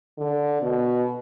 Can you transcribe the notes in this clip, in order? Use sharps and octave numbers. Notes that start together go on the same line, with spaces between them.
D3
B2